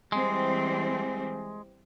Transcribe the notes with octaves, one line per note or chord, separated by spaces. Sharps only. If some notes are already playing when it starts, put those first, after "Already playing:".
E3 G3 G#3 C4